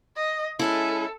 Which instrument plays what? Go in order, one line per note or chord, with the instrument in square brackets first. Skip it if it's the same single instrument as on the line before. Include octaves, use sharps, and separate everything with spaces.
[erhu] D#5
[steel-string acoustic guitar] G#3 C#4 E4 [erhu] A4